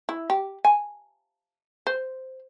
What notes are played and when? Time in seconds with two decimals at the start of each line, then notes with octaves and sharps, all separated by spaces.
0.09 E4
0.30 G4
0.65 G#5
1.87 C5